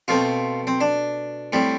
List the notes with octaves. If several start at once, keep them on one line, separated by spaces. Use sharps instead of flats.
B2 A3 C4 F4
C4
D4
A2 G3 C4